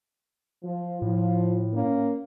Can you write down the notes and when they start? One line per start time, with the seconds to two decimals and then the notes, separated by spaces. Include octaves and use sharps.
0.64 F3
1.02 A2 F3
1.74 A#3 C#4